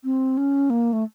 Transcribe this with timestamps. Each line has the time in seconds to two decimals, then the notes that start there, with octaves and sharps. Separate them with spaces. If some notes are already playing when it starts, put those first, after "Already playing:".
0.04 C4
0.37 C#4
0.70 A#3
0.93 A3